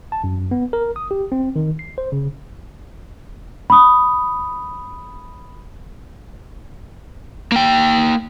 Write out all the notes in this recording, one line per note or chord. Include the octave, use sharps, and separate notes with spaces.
A5
F#2
B3
A#4
D#6
G4
C4
D#3
C7
C5
C#3
B5 D#6
A#3 G5